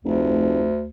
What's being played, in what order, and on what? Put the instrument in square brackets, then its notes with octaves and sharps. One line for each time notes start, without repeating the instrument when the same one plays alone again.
[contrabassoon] F1 [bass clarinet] D2